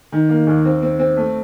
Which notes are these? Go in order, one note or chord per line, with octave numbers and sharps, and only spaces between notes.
D#3
A#3
D#2
C4
C4
C4
A3